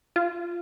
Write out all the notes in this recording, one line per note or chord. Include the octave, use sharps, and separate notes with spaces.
F4